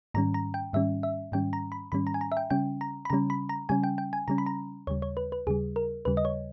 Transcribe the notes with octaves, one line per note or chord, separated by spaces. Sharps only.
G#2 D#3 G3 C#4 A#5
A#5
G5
G#2 D#3 G3 C#4 E5
E5
G#2 D#3 G3 C#4 G5
A#5
B5
G#2 D#3 G3 C#4 B5
A#5
G#5
A#5
E5
G5
C#3 G3 C#4 G5
A#5
B5
C#3 G3 C#4 A#5
B5
A#5
C#3 G3 C#4 G#5
G5
G5
G#5
C#3 G3 C#4 A#5
B5
A#5
D#2 C#3 G3 C#5
C#5
B4
B4
D#2 C#3 G3 G#4
A#4
D#2 C#3 G3 B4
D#5
C#5